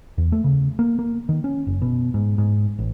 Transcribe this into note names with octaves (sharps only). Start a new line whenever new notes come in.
E2
A3
C#3
A#3
A#3
D#3
C#4
F#1
B2
G#2
G#2
A1